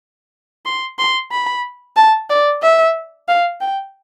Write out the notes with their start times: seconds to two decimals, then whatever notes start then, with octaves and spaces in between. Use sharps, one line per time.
0.65 C6
0.98 C6
1.31 B5
1.96 A5
2.30 D5
2.62 E5
3.28 F5
3.61 G5